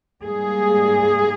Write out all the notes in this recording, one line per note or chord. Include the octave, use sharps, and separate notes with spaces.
G#2 G3 A#3 G#4